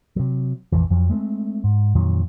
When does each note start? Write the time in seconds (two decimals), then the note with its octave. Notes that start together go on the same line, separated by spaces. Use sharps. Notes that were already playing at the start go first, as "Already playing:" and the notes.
0.16 C3 F#3
0.72 A#1 F2 E3
0.90 F2 F3 F#3
1.10 G#3 A3 B3 C4
1.64 G#2
1.95 F2 A#2 D#3 F#3